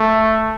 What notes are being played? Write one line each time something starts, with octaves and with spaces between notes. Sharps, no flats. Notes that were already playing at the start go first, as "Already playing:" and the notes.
Already playing: A3